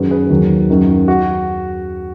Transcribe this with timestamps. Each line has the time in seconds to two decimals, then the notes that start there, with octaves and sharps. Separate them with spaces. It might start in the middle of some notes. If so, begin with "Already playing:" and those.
Already playing: F#2 D#3 F#3 G#4 B4
0.10 G#4 B4
0.30 D#2 D#3 F#3
0.70 F#2 D#3 F#3
1.08 F#4